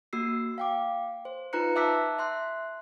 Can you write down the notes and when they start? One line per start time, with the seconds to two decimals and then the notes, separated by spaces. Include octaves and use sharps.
0.13 A#3 F#4 E6 C7
0.58 F5 G5 D6
1.25 C5
1.53 D#4 F4 B4 A#5 F#6 C#7
1.76 E5 A5 D6 E6 F#6 B6
2.19 E5 C6 F#6